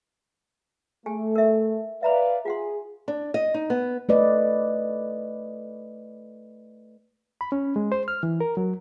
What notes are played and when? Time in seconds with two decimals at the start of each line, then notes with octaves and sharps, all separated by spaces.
1.06 A3 G4 G#4 G#5
1.36 A#4 E5
2.03 B4 D5 E5 F5 A#5 B5
2.45 F4 G#4 F#5 C6
3.08 D4
3.34 D#5
3.54 D#4
3.70 B3
4.09 A3 B4 D5 D#5
7.41 B5
7.52 C#4
7.76 G#3
7.92 C5
8.08 F6
8.23 E3
8.41 A#4
8.57 F#3